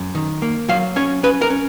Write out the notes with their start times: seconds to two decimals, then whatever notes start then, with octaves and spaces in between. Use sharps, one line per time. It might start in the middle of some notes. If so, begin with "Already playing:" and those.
Already playing: F#2
0.15 D#3
0.42 A#3
0.69 F#3 F5
0.96 C#4 C#5
1.23 C#4 B4
1.42 A#4
1.50 C#4